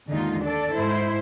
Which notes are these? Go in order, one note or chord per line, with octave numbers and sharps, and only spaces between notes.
D#2 G#2 D3 G#3 D#4 F4
D4 A4 D5
G#2 E4 C5